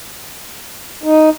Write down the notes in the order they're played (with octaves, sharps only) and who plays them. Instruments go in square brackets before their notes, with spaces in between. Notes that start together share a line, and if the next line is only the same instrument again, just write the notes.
[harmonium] D#4